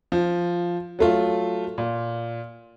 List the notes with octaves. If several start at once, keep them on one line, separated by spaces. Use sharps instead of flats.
F3
F#3 A3 F4
A#2